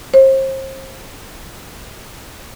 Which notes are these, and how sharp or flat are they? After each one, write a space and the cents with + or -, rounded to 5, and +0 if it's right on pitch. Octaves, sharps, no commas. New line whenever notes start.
C5 +35